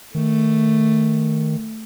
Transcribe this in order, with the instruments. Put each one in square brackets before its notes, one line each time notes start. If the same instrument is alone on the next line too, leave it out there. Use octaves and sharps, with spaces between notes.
[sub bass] D#3 [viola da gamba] A3